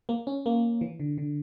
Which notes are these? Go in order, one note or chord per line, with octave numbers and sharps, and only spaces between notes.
A#3
C#4
A#3
E3
D3
D3